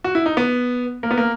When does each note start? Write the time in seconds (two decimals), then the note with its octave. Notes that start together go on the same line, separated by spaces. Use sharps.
0.04 F#4
0.15 E4
0.26 D#4
0.37 B3
1.03 A#3
1.11 B3
1.17 A#3